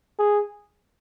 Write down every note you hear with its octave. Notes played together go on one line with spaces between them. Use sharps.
G#4